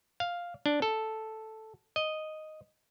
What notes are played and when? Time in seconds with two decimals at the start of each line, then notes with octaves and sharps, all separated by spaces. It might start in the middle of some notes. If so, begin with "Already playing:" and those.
0.20 F5
0.66 D4
0.82 A4
1.96 D#5